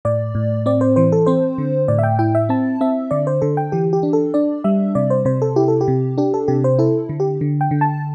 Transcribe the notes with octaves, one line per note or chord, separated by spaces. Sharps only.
A2 D5
A2
C4 D5
C5
E3 C5
A4
C4 C5
D3
A2 D5
E5
G5
E4 G5
E5
C4 A5
C4 E5
D3 D5
C5
D3 A4
G5
E3 G4
G4
D4
A4
D4 D5
G3 E5
C3 D5
C5
C3 C5
A4
E4 G4
A4
G4
C3
D4 G4
A4
C3 G4
C5
E4 A4
D3
G4
D3
G5
D3
A5